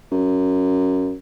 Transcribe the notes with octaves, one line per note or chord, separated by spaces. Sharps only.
F#2